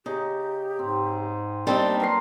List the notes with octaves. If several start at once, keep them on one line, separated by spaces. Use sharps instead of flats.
C#3 D#4 G4
G#2 C4
G3 A#3 C4 D4 D#4 D5
F#3 A#4 B4 C6